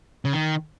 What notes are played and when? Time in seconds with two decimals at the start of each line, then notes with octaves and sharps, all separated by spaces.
0.25 C#3
0.33 D#3